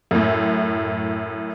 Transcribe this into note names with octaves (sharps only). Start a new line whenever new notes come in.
F#2 A2